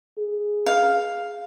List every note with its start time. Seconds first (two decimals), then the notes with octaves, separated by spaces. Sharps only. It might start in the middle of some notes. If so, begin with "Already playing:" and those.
0.18 G#4
0.66 F5